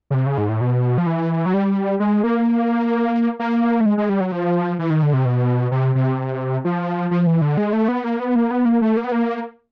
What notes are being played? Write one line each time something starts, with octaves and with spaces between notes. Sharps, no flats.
C#3
C3
C#3
G#2
A2
B2
F3
E3
F#3
G3
G#3
A#3
A#3
A3
G#3
G#3
G3
F#3
F3
E3
D#3
D3
C3
B2
C3
C3
F3
F3
E3
D3
G#3
A3
B3
A#3
B3
A#3
B3
A#3
A3
A#3
B3
A#3